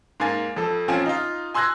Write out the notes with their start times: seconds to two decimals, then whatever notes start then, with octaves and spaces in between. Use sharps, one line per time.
0.20 G#2 A#3 F5 G#5 A6
0.56 F2 A4
0.88 A#2 F3 C4 C#4 F4 G#5
1.06 D#4 F4
1.54 G#5 C6 E6 F#6 G#6 A#6